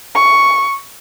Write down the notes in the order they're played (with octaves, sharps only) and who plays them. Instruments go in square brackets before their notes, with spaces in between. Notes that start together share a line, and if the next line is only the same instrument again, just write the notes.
[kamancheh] C#6